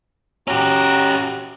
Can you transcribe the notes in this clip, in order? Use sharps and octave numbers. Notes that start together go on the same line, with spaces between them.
C#4 F#4 G4 A#5